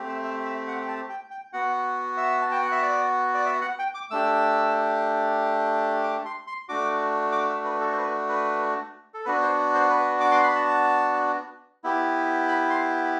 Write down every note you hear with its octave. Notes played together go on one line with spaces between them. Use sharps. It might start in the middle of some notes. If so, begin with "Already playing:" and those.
Already playing: A3 C4 G4
E5
E5
E5
F#5
G5
A5
G5
G5
B3 F#4 F#5
E5
A5
G5
F#5
E5
D5
D5
E5
F#5
G5
D6
A3 D4 G4 E6
D6
C6
C6
A3 D4 F#4 D6
D6
E5
B4
A4
C5
B4
B4
A4
B3 D4 F#4 B4
C5
C5
B4
D6
C6
B5
A5
B3 E4 G4
B5
C6